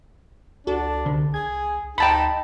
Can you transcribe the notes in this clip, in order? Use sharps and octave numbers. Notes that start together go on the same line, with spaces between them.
C#2 D4 F#4 A4
C2 D3
C2 G#4 G#6
D2 D#4 G5 A5 B5